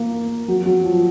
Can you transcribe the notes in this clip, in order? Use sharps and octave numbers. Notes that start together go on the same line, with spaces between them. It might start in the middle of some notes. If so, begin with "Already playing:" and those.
Already playing: A#3
F#3
F#3
F3